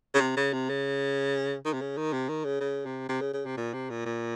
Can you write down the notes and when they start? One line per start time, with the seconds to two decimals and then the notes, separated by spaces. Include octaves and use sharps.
0.15 C#3
0.21 C3
0.37 C#3
0.53 C3
0.70 C#3
1.65 D#3
1.73 C3
1.81 C#3
1.98 D#3
2.13 C3
2.29 D#3
2.45 C#3
2.61 C#3
2.86 C3
3.09 C3
3.21 C#3
3.34 C#3
3.46 C3
3.58 A#2
3.74 C3
3.90 A#2
4.06 A#2